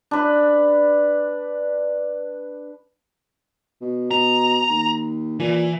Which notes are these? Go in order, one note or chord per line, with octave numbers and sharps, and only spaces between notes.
D4 B4
B2
B2 A#5
D#2
A#2 E3